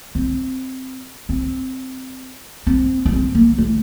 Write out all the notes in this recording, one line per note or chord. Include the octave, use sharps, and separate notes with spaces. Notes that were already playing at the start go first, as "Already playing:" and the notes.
C4
C4
C4
D4
C4
A#3
A3